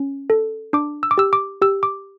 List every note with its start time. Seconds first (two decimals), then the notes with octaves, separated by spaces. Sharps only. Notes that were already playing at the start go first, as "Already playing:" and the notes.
Already playing: C#4
0.30 A4
0.73 D4 D6
1.03 E6
1.11 D6
1.18 G4 E6
1.33 D6
1.62 G4 E6
1.83 D6